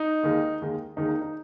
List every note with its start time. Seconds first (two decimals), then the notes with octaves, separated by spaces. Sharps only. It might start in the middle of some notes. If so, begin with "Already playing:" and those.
Already playing: D#4
0.23 D#2 D#3 G#3
0.61 D#2 D#3 G#3
0.96 D#2 D#3 G#3 D#4
1.09 D#4
1.22 D#4